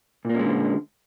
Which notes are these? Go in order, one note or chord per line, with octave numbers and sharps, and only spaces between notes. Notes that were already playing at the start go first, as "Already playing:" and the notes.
A#2 D3 G#3 A#3 C#4